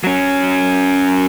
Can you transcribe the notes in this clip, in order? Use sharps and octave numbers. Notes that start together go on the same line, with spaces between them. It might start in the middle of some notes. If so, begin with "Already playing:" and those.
F#3 C#4